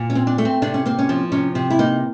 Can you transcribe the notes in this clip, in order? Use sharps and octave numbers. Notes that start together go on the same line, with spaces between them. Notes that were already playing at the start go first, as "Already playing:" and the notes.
Already playing: A#2
C#4
C4
D4
A3
C4
C3 D4
C#4
A#3 C4
C#4
F3
C3 C#4
C3
E4
A#3 D#4